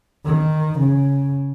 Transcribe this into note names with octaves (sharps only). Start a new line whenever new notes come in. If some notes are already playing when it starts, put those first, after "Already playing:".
D#3
C#3